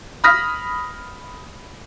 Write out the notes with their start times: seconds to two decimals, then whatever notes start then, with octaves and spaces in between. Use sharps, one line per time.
0.24 B5 D#6 F6 A#6 B6